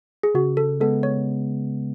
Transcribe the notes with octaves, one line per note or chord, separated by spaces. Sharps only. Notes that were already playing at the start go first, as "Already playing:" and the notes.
G#4
C#3 F#4
A4
G#3 B3 A4
C#5